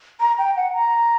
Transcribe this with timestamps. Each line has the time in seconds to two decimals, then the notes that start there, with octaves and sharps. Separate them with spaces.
0.20 A#5
0.38 G5
0.56 F#5
0.74 A#5